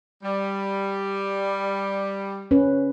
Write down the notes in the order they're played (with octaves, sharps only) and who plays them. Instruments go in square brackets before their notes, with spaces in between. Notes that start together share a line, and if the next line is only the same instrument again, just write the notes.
[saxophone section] G3
[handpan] C#4 B4